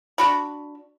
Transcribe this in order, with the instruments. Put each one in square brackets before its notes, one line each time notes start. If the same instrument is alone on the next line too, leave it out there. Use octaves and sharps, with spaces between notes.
[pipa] D4 F#4 B5